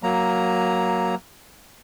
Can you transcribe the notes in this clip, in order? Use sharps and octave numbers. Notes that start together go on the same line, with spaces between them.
F#3 A#3 A#5